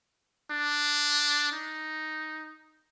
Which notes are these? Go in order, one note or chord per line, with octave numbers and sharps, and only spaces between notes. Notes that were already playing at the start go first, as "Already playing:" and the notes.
D4
D#4